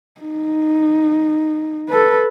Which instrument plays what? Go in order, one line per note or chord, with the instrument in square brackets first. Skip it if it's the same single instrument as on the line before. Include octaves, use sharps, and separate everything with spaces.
[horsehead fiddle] D#4
A4 B4